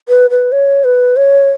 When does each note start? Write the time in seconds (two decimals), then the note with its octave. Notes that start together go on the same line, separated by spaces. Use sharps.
0.09 B4
0.30 B4
0.52 C#5
0.84 B4
1.16 C#5